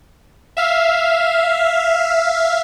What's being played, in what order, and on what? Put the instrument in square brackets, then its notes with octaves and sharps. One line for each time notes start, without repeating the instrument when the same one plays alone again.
[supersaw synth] E5 F5